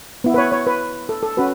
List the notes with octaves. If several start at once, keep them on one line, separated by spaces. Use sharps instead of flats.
B3 E4
B4
C#5
C#5
B4
A4
A4
C#4 F#4 B4